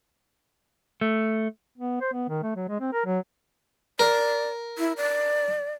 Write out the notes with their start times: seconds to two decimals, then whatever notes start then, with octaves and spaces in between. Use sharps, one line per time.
1.01 A3
1.78 B3
2.01 C5
2.13 B3
2.29 D#3
2.43 A3
2.56 F#3
2.69 G#3
2.81 C4
2.93 A#4
3.06 F#3
3.99 A#4 D5
4.78 E4
4.97 D5